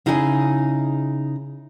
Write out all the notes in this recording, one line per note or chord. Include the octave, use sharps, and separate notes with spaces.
C#3 D#4 E4 G#4 F#5 G#5